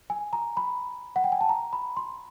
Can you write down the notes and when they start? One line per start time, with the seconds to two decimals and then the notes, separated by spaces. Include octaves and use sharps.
0.10 G#5
0.33 A#5
0.57 B5
1.16 F#5
1.24 G5
1.32 G#5
1.41 A5
1.49 A#5
1.73 B5
1.97 C6